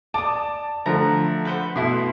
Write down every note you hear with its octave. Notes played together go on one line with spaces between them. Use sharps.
D5 A5 D#6
D3 F3 A3 A#5
B4 C5 F#5
B2 A3 E4 C6